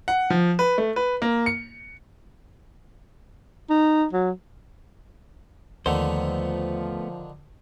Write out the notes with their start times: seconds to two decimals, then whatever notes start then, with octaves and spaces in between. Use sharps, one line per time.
0.08 F#5
0.30 F3
0.59 B4
0.78 A3
0.96 B4
1.22 A#3
1.46 C#7
3.70 D#4
4.13 F#3
5.86 D#2 D3 D#3 F3 A3 B3 C5